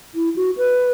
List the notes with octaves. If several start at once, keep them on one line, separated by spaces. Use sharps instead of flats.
E4
F#4
B4